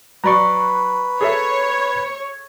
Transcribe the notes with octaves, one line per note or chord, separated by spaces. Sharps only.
F#3 B4 D5 A#5 B5 C#6
G#4 A4 C#5 E5